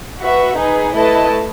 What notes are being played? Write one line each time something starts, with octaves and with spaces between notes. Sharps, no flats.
F#4 B4 E5
D#4 G#4 B4
A3 E4 B4 D#5 A5